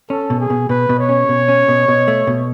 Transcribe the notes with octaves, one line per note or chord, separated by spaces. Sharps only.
C#4 A4
B2
G#4
B2
B2 B4
B2
C#5
C#4
B2
C#4
B2
B2
A3
B2